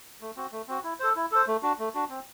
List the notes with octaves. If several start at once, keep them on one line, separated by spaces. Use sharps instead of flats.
A3
C4 F#4
A3
C4 F#4
E4
A4 C5
E4
A4 C5
A3
D4 F#4
A3
D4 F#4
C4